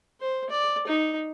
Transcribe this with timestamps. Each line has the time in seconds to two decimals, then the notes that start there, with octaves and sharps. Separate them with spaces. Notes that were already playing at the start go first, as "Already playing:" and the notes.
0.20 C5
0.50 D5
0.87 D#4